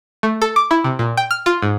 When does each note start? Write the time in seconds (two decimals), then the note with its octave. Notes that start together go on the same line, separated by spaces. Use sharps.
0.23 A3
0.42 A4
0.56 D6
0.71 E4
0.84 C3
0.99 A#2
1.17 G5
1.31 F6
1.46 F4
1.62 G#2